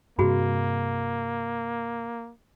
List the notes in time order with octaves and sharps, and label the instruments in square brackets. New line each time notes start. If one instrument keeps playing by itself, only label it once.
[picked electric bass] G2 C3 [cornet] A#3 [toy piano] F#4 G#4 B5